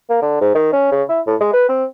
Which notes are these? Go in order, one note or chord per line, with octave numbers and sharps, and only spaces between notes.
A#3
D3
G#2
D#3
C#4
C#3
E4
A2
G#3
B4
C4